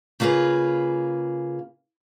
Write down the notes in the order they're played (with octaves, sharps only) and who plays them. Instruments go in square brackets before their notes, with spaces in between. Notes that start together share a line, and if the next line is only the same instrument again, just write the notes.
[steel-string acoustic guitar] C#3 A#3 F4 G#4 B4